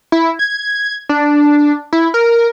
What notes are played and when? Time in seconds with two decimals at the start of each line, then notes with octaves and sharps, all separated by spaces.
0.12 E4
0.39 G#6
1.09 D4
1.93 E4
2.14 A#4